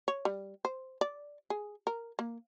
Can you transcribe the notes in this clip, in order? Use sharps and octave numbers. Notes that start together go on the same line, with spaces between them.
C#5
G3
C5
D5
G#4
A#4
A#3